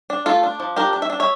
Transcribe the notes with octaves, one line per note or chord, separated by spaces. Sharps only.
D4
A3 F4 A4
D4
F3
D4 G4 A#4
D4
E5
D4
C#5 E5